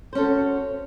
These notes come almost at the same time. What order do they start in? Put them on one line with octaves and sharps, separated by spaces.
C5 C#4 A4 F#4